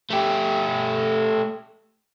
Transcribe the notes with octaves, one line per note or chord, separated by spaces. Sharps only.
A3 G4